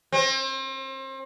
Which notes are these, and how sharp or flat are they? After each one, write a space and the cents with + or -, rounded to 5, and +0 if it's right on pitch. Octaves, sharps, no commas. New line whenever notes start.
C4 +35